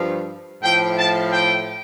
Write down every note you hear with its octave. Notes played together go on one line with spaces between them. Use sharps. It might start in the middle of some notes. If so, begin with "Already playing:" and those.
Already playing: G2 F3
A2 F3 G5
A5
G5